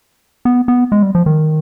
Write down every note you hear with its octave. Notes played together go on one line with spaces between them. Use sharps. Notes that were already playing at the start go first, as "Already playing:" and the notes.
B3
B3
G#3
G3
F3
D#3